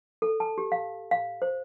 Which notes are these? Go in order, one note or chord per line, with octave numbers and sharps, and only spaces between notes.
A4
A5
G4
F5
F5
C5